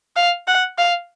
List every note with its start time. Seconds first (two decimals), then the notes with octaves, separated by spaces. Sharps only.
0.16 F5
0.48 F#5
0.78 F5